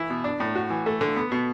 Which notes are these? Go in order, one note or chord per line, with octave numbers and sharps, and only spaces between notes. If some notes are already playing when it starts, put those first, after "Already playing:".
Already playing: E3 E4
B2
D4
A2
F#4
E3
A3
D3
B3
B2